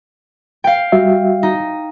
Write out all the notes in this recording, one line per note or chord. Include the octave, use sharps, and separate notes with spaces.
F5 G5
G3 F#4 E5
D#4